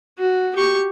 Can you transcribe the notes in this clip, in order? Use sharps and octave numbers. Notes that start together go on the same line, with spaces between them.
F#4
G4 C#6